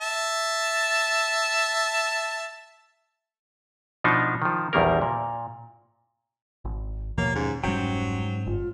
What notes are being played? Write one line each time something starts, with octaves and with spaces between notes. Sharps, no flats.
E5 A5
B2 F3 D4 D#4
D#3 F3
A#1 E2 D#3 G3 A#3 A#4
A#2
G#1
D#2 B2 F3 A#3 C#5
G#2 C#4
F1 G#2 F#3 G3 C#4 C5 G5
G1 F4